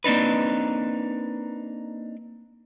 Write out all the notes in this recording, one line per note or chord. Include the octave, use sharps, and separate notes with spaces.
A#3 C4 D4 D#4 B4